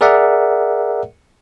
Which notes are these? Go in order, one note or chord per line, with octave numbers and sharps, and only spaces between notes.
G#4 A#4 D5 E5 F#5